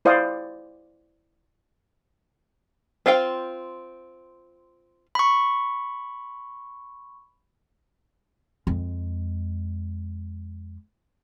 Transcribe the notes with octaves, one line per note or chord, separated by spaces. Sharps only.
E4 C5 D5 F5 D#6
C4 F4 F5 G5
B5 C#6
F2 G#3